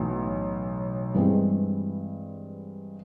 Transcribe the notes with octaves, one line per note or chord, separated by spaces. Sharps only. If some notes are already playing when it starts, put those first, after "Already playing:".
Already playing: B1 A2 E3
G2 E3 G#3 C4